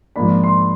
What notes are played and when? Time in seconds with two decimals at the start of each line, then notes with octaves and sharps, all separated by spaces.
0.16 G#2 F3 A#3 D4 B5
0.44 C6